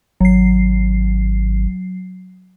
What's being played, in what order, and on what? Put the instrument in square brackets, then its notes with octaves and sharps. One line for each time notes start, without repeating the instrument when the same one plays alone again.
[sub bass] G#1 [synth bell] F#3 C7